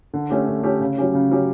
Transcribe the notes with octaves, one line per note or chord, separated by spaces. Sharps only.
D3
A3 C#4 G4
D3
A3 C#4 G4
C#3
F#3 C#4 G4
C#3
F#3 C#4 G4